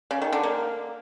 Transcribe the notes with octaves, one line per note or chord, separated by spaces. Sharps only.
C#3
D#3
D3
A#3